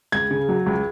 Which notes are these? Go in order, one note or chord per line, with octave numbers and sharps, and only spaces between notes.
C#2 G#6
C#3
F#3
C#2